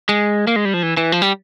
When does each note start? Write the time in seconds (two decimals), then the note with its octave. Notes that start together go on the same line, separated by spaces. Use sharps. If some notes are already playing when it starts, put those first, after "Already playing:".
0.09 G#3
0.47 A#3
0.56 G#3
0.65 G3
0.74 F3
0.83 E3
0.97 E3
1.12 F3
1.22 G3